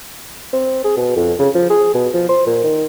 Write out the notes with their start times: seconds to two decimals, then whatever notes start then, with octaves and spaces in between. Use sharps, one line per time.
0.53 C4
0.84 G#4
0.97 B2
1.16 F2
1.39 C#3
1.55 F3
1.70 G#4
1.94 B2
2.14 F3
2.29 C5
2.47 A#2
2.64 D#3